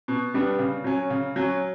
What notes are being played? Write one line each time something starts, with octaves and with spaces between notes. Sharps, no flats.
B2
G3 B3 D4
C#3
F#3 C#4
C#3
F#3 C#4